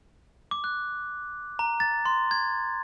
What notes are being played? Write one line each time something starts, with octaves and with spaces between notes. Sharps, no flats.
D6
F#6
A#5
A6
C6
G#6